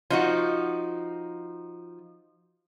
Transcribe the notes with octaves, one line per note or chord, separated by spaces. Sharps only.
F3 D#4 F#4